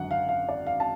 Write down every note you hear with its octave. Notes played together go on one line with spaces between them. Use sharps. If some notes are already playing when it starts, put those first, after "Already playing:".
Already playing: G#1 F#2 D3 F#3 F#5
F5
F5
D5
F5
A5